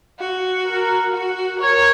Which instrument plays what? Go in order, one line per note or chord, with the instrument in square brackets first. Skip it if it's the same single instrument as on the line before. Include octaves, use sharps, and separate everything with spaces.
[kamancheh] F#4
[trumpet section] A#4
[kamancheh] F#4
[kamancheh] A#4 [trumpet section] C#5